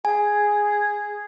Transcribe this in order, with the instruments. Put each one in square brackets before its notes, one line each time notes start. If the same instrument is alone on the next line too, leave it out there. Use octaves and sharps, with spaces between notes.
[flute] G#4 [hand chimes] G#5